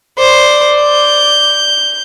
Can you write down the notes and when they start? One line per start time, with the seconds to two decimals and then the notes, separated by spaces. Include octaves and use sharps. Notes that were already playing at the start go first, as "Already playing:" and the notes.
0.18 C5 D5
0.84 G6